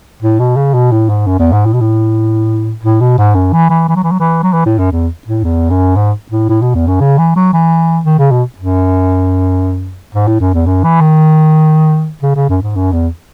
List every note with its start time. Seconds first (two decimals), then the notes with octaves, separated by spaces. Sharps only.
0.22 A2
0.39 B2
0.56 C#3
0.74 B2
0.92 A2
1.09 G#2
1.26 F#2
1.39 E2
1.52 G#2
1.65 A2
1.74 B2
1.81 A2
2.83 A2
3.01 B2
3.18 G#2
3.35 F#2
3.53 E3
3.70 E3
3.88 E3
3.96 F#3
4.03 E3
4.11 F#3
4.20 E3
4.43 F#3
4.53 E3
4.66 A2
4.78 F#2
4.92 E2
5.27 A2
5.44 E2
5.70 F#2
5.96 G#2
6.31 A2
6.49 A2
6.62 B2
6.75 E2
6.87 F#2
7.01 C#3
7.18 E3
7.36 F#3
7.53 E3
8.05 D#3
8.18 C#3
8.31 B2
8.58 F#2
10.14 G#2
10.27 A2
10.40 F#2
10.53 E2
10.66 F#2
10.84 E3
11.01 D#3
12.22 C#3
12.36 C#3
12.49 F#2
12.62 G#2
12.75 F#2
12.92 E2